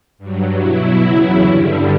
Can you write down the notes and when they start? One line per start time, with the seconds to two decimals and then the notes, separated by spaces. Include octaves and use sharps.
0.18 G2 F#3
0.58 B2 F#3 E4
1.00 E2 C#3 F#3
1.40 G2 D3 G3